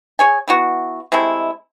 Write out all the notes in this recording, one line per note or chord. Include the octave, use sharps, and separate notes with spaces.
G#4 C#5 G#5
E3 B3 F#4
C3 G#3 A3 E4